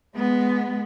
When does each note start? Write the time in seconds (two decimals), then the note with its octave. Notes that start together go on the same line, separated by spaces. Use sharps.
0.16 G#3 B3